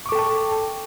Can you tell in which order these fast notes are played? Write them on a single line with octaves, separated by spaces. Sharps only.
C#6 D6 A4 G5 A5